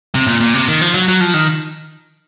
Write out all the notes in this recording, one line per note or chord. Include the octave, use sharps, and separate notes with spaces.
C3
A#2
A#2
C3
D#3
F3
F#3
F#3
F3
D#3